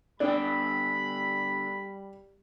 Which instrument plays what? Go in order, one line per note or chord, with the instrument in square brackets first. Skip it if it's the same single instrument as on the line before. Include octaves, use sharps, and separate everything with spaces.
[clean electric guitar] D3 B3 G5 [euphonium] G3 [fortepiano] D4 [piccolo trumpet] B5